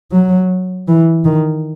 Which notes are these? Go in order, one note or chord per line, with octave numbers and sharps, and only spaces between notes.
F#3
E3
D#3